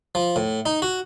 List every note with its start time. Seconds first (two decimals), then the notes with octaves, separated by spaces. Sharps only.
0.15 F3
0.36 A2
0.66 D#4
0.82 F#4